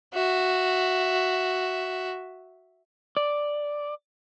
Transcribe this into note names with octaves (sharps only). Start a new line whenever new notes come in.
F#4 E5
D5